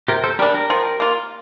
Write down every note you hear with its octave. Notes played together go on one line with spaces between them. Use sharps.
C3 G4 A#4
A4 C5
G3 D4 G4 A#4
G4 A#4
F3
A#3 F4